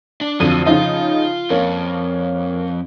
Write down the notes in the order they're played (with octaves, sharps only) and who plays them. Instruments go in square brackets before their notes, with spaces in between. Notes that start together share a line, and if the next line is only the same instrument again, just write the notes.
[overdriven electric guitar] D4
[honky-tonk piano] F2 D3 D#7 [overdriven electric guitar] F3 F#3
[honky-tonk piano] C#3 F3 D#4 [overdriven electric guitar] F4
[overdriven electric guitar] F2 [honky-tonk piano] A#3 C#4